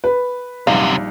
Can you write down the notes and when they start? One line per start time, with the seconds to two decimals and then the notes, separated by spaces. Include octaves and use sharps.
0.04 B4
0.67 A#1 F#2 C3 G3 D#4 F5